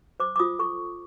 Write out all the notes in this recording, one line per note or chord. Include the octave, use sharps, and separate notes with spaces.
C5 D6
D6
F4 D#6
A4 C#6